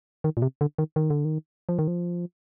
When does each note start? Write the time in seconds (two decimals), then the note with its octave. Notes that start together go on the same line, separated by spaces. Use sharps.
0.24 D#3
0.37 A#2
0.42 C3
0.61 D3
0.78 D#3
0.96 D#3
1.10 D3
1.25 D#3
1.69 F3
1.79 D#3
1.88 F3